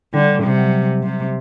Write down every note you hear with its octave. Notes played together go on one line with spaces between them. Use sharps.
D3 G3
C3 G3
F#3
C3